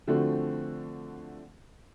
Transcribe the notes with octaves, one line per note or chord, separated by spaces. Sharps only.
D3 F3 A3 C4 F#4